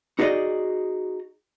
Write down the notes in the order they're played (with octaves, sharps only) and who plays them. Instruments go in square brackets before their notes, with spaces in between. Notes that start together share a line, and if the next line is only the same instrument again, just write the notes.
[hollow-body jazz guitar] D#4 F#4 G#4 D5 D#5